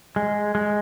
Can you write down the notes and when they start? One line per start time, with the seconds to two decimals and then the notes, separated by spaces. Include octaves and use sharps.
0.16 G#3
0.55 G#3